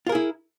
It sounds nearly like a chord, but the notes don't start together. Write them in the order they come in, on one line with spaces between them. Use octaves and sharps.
F4 A#4 G#4 E4